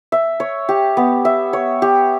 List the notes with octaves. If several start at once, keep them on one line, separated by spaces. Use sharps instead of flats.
E5
C#5
G4
B3
E5
C#5
G4